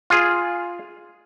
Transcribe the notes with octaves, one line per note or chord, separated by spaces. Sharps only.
F4 G#4